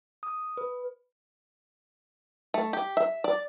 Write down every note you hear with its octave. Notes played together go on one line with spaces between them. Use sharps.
D#6
B4
A3
G4
E5
D5